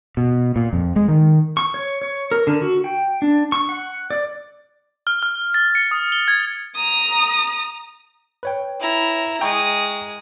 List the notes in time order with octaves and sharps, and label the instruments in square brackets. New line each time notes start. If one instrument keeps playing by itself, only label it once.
[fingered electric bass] B2
A#2
F2
G#3
D#3
[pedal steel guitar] C#6
C#5
C#5
A#4
D3
F#4
G5
D4
C#6
F#5
D5
[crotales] F6
F6
A6
C#7
D#6
G7
G#6
[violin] A#5 D#6
[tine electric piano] B4 C#5 G5
[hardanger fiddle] E4 A#5
[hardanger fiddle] G#3 D#6 [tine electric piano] G5 A#5 C#6